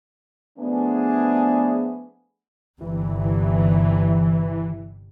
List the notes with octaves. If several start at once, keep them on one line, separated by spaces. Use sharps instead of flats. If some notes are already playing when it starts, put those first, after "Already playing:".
F3 A3 B3 D4 G#4 G#5
G1 C3 E3